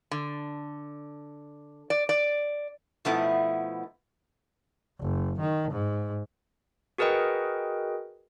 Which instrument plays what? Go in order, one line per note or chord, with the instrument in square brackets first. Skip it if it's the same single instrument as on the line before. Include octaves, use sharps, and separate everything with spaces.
[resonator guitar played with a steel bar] D3
D5
D5
B2 F3 A3 B3 D#4 E4
[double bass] F#1
D#3
G#2
[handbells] F#4 G#4 A#4 B4 D#5 G5